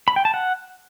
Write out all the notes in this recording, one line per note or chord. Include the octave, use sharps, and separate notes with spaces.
B5
G5
A5
F#5